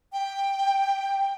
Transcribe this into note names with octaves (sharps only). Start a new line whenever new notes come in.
G5